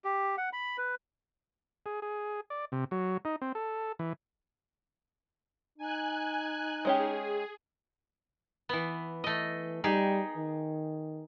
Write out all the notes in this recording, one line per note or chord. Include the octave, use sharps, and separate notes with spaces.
G4
F#5
B5
B4
G#4
G#4
D5
C3
F#3
D#4
C4
A4
E3
D#4 G#5 F#6
G#3 C#4 G4 G#4
E3 B3
E3 A3 D#5
G3 D#4 G4 G#4
D#3